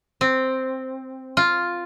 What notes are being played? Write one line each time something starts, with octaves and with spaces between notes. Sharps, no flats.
C4
F4